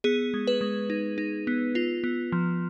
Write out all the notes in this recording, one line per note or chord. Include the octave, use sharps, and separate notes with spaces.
B3 G#4
G#3
B4
G#3
D#4
D#4
B3
F4
B3
F3